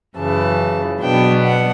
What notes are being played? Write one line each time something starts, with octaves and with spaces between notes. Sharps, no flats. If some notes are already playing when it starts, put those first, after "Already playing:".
F#2 C#3 E3 A5
B2 F#3 B3 D4 G5
F#5